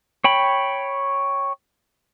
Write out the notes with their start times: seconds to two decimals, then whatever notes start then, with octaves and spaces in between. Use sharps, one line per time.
0.24 C#5 G5 B5